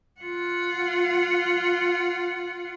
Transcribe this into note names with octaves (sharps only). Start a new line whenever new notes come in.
F4 F#5